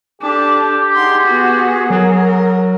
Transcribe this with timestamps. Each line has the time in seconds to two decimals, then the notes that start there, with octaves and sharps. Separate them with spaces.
0.22 D4 G4 A4 A5 D6
0.96 D#4 G#4 F#5 C6
1.27 B3 F#4
1.90 F#3 A#4